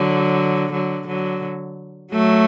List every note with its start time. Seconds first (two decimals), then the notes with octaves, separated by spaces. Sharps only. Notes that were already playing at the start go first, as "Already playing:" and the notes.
Already playing: D3 F#3
0.72 D3 F#3
1.07 D3 F#3
2.13 F#3 A3